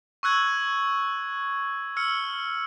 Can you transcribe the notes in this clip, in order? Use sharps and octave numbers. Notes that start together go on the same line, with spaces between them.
C#6 E6 F#6 G#6
E6 F6 C#7